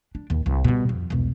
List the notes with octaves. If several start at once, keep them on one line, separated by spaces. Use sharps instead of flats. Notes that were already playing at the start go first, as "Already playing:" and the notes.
D4
D#2
C2
B2 G3
F2
E1 C2